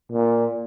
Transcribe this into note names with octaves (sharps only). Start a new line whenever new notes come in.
A#2